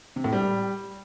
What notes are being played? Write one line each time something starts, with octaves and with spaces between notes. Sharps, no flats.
C3
A2
G3